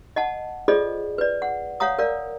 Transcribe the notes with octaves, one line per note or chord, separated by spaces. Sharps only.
D#5 F#5 A5
F4 G#4 A4 C5 D5 D#5
B4 D5
F#5
C#5 F5 F#5 A#5 D#6
A#4 D5 F5